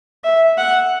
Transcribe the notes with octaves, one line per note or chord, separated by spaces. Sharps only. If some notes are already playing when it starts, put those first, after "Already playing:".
E5
F#5